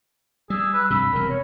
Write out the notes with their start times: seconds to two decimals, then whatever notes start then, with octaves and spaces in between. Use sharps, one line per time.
0.50 G3 G#4 E6
0.74 B4
0.90 G2 C3 B5 E6
1.12 E1 C3 A#4
1.29 C#5